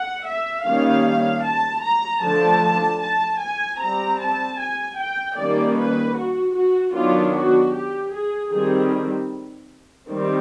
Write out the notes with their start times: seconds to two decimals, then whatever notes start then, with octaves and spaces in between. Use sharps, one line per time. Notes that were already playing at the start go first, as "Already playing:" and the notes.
Already playing: F#5
0.25 E5
0.64 D#3 G3 A#3 C#4 F5
1.43 A5
1.83 A#5
2.22 D3 F3 A3 D4 A5
3.02 A5
3.40 G#5
3.80 G3 C4 A#5
4.19 A5
4.59 G#5
4.97 G5
5.36 D#3 G3 A#3 C#4 D5
5.76 B4
6.16 F#4
6.54 F#4
6.94 D#3 F#3 B3 D4 F4
7.34 F#4
7.74 G4
8.13 G#4
8.51 D#3 G3 C4 G#4
10.09 D#3 G3 C4